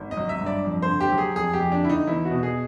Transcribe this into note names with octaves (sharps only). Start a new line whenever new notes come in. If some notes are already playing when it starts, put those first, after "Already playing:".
Already playing: G#1
D#5
F#3
E5
G2
D5
F2
C5
D3
G4
F#3
G#4
F2 G#4
G4
F2
D4
D3 E4
D#4
E2 E4
F#4
B2
G#4